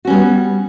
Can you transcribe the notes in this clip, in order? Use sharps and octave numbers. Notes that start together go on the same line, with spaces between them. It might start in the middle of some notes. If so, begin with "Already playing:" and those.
G3 B3 C#4 F#4